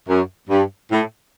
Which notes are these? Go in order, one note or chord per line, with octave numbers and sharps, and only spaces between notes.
F#2
G2
A2